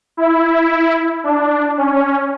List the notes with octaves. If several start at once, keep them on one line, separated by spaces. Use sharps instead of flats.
E4
D4
C#4